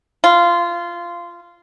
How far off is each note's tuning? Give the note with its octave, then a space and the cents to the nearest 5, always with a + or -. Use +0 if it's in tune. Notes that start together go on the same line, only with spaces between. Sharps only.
F4 -15